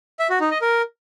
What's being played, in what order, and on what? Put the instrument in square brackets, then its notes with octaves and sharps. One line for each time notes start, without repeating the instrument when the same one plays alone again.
[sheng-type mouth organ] E5
F#4
D#4
D#5
A#4